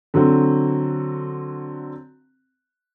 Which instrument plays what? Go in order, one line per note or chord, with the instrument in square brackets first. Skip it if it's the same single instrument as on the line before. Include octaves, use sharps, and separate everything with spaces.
[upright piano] D3 F#3 C4 F#4